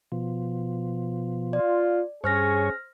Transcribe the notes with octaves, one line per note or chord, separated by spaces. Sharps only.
B2 F3
F4 D5
G2 C#4 G#4 C5 C#5 F6 A#6